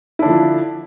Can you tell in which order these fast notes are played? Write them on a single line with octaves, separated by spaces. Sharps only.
E4 D4 D3 F3